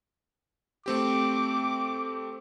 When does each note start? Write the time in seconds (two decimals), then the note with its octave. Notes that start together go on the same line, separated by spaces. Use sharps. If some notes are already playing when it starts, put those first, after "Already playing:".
0.86 A3 C4 G4 D6